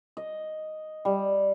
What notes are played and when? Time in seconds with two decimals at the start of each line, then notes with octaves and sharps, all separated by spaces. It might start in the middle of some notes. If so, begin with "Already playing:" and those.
0.17 D#5
1.05 G3